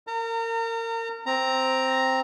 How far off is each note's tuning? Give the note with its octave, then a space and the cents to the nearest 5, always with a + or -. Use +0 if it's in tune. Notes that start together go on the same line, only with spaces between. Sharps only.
A#4 -30 A#5 -40
C4 +0 A#5 +0